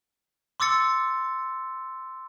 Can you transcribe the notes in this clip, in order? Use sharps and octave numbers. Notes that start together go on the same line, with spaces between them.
C6 D6 E6 A6 C#7